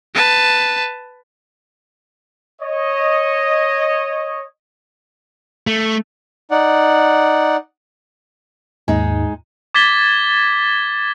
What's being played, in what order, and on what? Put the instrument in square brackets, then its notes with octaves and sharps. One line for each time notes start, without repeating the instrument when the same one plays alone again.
[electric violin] B4 A5
[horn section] C#5 D#5
[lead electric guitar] A3
[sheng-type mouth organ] D#4 D5 F#5
[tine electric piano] D#2 G#2 [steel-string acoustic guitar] G#3 D#4
[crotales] D6 G#6 A6 B6 G7